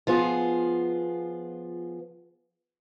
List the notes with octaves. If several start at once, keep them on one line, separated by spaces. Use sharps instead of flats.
F3 B3 F4 G#4